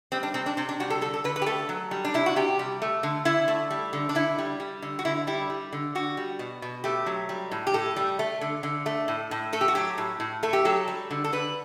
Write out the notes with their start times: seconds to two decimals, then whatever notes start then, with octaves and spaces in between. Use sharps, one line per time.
0.12 G3 C4
0.23 D4
0.34 C3 C4
0.46 D4
0.57 C3 C4
0.69 D4
0.80 G3 F#4
0.90 A4
1.01 D3 A4
1.14 A4
1.24 D3 B4
1.36 B4
1.42 G4
1.46 A3 A4
1.69 F#3
1.91 G3
2.05 D4
2.14 C3 E4
2.26 F#4
2.36 C3 G4
2.59 G3
2.82 A3
3.03 D3
3.25 D3 E4
3.48 A3
3.71 G3
3.93 D3
4.09 D4
4.15 D3 E4
4.38 G3
4.60 G3
4.82 D3
4.99 F#4
5.05 D3 E4
5.27 G3 E4
5.50 G3
5.72 D3
5.95 D3 F#4
6.17 G3
6.39 B2
6.62 B2
6.84 A3 G4
7.06 F#3
7.29 G3
7.51 A2
7.67 G4
7.74 A2 A4
7.96 G3
8.19 A3
8.41 D3
8.63 D3
8.86 A3
9.08 A2
9.31 A2
9.53 A3 A4
9.61 G4
9.68 F#4
9.75 F#3 G4
9.98 A2
10.20 A2
10.43 A3 A4
10.53 G4
10.65 F#3 A4
10.88 G3
11.11 D3
11.24 A4
11.33 D3 B4